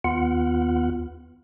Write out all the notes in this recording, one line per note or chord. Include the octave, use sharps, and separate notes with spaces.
D#2 B3 F4 F#5